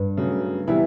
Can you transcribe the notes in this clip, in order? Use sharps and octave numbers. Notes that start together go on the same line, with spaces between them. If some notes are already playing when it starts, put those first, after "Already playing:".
Already playing: G2
C#3 F#3 A3
C3 E3 G3 B3 E4